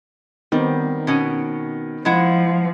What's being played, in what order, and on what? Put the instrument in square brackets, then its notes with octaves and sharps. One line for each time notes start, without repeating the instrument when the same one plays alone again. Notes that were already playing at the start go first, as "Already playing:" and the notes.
[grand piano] D#3 [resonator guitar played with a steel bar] G3 [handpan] B3 C4 D#4
[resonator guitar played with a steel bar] B2 C#4
[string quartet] F3 [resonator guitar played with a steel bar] G#3 E4 F#5